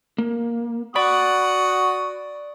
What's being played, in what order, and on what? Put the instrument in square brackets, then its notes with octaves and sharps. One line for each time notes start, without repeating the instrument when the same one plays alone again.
[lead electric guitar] A#3
[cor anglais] F#4 [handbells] D5 D7 [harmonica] F#5 D#6 [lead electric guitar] B5